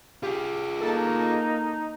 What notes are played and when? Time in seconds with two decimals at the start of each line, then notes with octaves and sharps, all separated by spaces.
0.23 F4 G4 G#4
0.81 A#3 D#4 A4 A5